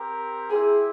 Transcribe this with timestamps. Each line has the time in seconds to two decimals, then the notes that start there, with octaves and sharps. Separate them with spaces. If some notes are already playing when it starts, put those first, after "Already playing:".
Already playing: C4 G4 A#4
0.50 E4 G4 G#4 C5 E5 G5